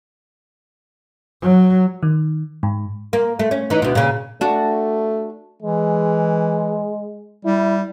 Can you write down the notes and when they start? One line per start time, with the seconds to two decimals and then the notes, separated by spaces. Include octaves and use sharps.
1.42 F#3
2.03 D#3
2.63 G#2
3.13 A#3
3.39 A3
3.51 C#4
3.70 E3 D#4
3.82 D2 B2
3.95 A#2 C#3
4.41 A3 D4 F#4
5.62 E3 G#3
7.45 G3 E4